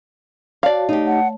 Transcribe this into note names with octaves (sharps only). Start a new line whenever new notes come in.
F#4 C#5 D5 F5 A5
A3 D#4 G4 C#5 A5
F#5